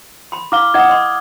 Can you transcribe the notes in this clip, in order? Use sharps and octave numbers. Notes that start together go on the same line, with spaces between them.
B5 C6
E4 F5 D6 F6 G7
E4 D#5 F#5 D#6 G#6
D#5 C6